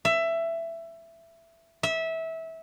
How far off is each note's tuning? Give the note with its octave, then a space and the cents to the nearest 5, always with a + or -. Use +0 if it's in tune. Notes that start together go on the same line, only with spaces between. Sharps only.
E5 +15
E5 -20